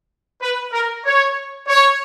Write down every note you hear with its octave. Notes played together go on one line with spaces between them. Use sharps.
B4
A#4
C#5
C#5